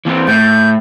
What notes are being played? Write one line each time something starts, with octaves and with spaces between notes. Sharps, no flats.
E3 C4
A2 G6